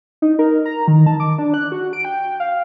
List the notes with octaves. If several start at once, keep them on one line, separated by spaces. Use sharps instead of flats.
D#4
A#4
A#5
D#3
A5
D6
D4
F#6
F#4
D7
G5
F5